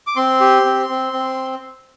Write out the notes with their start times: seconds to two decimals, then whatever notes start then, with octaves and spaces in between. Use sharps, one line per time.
0.07 D6
0.16 C4 C6
0.40 G4
0.65 C4
0.89 C4
1.13 C4